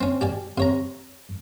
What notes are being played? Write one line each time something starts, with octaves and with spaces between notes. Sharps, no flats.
C4 C#4
G4 D5 G#5
C3 C#5 A#5